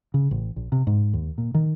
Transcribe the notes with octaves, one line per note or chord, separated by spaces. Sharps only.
C#3
A1
A#1
C3
G#2
D#2
A#2
D#3